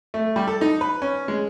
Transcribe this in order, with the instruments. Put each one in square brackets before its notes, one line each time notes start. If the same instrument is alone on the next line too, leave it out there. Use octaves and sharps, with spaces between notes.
[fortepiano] A3
G3
A4
D#4
B4
C#4
G#3